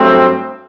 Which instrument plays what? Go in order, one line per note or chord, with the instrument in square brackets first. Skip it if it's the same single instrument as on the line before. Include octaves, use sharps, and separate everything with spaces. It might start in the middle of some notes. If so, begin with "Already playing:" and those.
Already playing: [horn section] G2 F#3 A3 C4